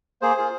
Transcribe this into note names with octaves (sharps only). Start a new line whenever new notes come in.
A#3 G#4 C5
F4 G#4